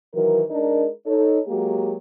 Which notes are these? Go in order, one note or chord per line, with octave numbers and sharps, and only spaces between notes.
D#3 E3 F#3 A#4
G#3 D4 D#4 A#4
D#4 A4 C#5
F#3 G#3 A#3 F#4 G4